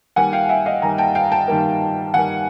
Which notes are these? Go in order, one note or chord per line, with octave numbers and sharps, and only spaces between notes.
D#3 G3 A#3 F#5 G#5
F5 G5
E5 F#5
D#5 F5
D#3 G3 A#3 G#5 A#5
G5 A5
F5 G5
G5 A5
D#3 G3 A#3
D#3 G3 A#3 F#5 G#5